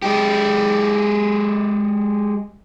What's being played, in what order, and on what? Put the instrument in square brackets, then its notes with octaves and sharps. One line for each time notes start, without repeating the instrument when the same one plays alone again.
[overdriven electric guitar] G#3 G4